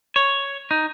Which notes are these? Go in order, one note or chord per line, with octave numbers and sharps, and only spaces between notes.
C#5
D#4